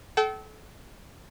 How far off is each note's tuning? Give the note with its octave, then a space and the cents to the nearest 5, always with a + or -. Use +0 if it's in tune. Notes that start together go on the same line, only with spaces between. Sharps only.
A4 -30 G5 -40